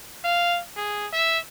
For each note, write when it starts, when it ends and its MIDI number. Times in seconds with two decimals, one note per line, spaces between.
0.24 0.59 77
0.77 1.07 68
1.13 1.38 76